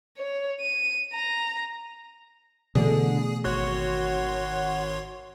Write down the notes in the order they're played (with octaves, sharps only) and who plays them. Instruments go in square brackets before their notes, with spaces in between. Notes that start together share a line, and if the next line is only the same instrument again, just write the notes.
[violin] C#5
D#7
A#5
[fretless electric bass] B2 E3 A3 [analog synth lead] D3 [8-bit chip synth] G#4
[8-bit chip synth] G#1 C#5 C6 [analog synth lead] F#4